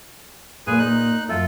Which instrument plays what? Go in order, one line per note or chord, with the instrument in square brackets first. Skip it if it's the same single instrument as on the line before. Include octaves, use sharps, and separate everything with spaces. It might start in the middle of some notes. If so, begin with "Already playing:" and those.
[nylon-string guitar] A#2 A#3 [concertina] G#4 B4 G#5
[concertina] D#4 F#6
[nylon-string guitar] F#2 E5 [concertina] F4 A4